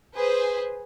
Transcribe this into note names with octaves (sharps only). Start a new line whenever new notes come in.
G#4 B4 C5